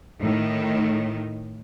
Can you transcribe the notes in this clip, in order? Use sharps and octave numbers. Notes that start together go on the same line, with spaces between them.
A2 D#3